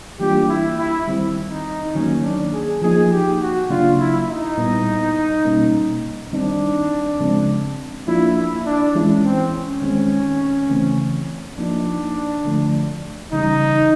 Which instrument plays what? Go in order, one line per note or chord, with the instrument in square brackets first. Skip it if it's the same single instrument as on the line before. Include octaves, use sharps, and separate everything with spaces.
[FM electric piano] E3 G3 A#3 D4 F4 [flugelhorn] G4
[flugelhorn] E4
E4
[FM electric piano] D#3 G3 C4
[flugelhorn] D#4
[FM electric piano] D#3 F#3 A#3 [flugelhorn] C#4
[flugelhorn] D4
G#4
[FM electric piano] F3 A#3 D#4 [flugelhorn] G#4
[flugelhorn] G4
F#4
[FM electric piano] C#3 F#3 A#3 D4 [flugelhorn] F4
[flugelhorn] E4
D#4
[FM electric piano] A#2 G3 B3 E4
B2 G3 A#3 C#4
[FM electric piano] D#3 G3 C4 D#4 [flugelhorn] D4
[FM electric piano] C#3 F3 G#3 C4
[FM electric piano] F3 A#3 D4 F4 [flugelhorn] E4
[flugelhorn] E4
D4
[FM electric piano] E3 G#3 C#4 E4
[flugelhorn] C4
C#4
[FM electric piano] D#3 G#3 C4
C#3 E3 A3 C4
[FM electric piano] F3 A#3 D#4 [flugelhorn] D4
[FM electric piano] D3 F3 A3
[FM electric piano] C#3 E3 G3 [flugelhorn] D#4